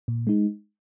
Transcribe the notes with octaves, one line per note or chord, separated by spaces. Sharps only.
A#2
G#3 D#4